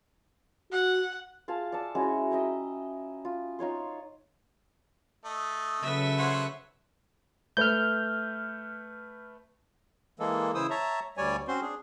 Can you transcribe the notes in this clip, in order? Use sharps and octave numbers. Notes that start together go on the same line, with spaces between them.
F#4 F#5
F4 G#4 F5 A5
D5 F#5 A5 E6
G#3 C#4 E4 F#4
D#5 E5 G5 A#5
F4
D#4 F4 C#5 C6
A3 D#5
C#3 F#3 A4 B4 E5
C5 C#5 F#5
A3 B4 F6 G6
E3 G#3 A#3 A4
C#3 E3 E4 C5 D#6 E6
C#5 E5 A5 A#5
D2 G3 C#5 D5 G#5
C4 C#4 F#4 C5 C6
D4 G#4